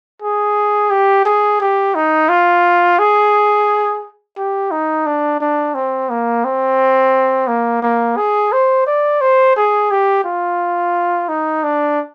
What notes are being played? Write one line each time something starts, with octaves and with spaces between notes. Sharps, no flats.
G#4
G4
G#4
G4
D#4
F4
G#4
G4
D#4
D4
D4
C4
A#3
C4
A#3
A#3
G#4
C5
D5
C5
G#4
G4
F4
D#4
D4